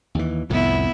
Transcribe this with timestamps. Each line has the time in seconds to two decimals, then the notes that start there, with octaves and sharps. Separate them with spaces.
0.15 D#2 E3
0.50 C2 F2 A2 B3 E4